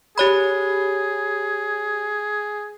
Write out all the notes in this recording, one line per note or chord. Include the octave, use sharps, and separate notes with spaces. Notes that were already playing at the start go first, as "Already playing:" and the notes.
G4 G#4 C#5 B5